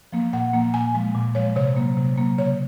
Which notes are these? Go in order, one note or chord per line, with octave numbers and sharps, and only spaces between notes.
F3 A#3
A#2 F#5
F3 A#3
A#2 G#5
F3 G#3
A#2
F3 G#3 C#5
C3 C#5
F#3 A#3
C3
F#3 A#3
C#3 C#5